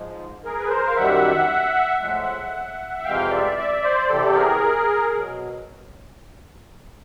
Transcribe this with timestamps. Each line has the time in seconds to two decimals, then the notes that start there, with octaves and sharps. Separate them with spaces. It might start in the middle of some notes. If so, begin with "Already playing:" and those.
Already playing: G#2 F3 G#3
0.44 G#4 A#4
0.60 B4
0.69 A#4 C5
0.87 F5
0.96 F#2 D#3 G3 E5 F#5
2.01 A2 F3 G#3
2.99 F#5
3.04 F2 C3 E3 G#3 F5 G5
3.31 D5 E5
3.57 D5 E5
3.83 C5 D5
4.09 E2 C3 E3 G4 A4
4.35 G#4 A#4
5.14 B2 F#3